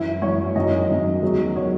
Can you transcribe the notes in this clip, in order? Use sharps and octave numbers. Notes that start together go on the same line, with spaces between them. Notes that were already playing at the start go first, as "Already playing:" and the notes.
Already playing: F#2 E3 E4
F#2 E3 C#5
F#2 D#3 F#3 D#5
F#2 D#3 F#3
E2 D#3 F#3
D#3 F#3 C#5